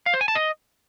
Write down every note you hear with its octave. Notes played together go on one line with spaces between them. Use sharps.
F5
C5
G#5
A5
D#5